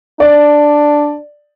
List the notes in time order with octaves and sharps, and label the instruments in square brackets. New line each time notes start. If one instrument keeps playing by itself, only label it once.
[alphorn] D4 [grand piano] D5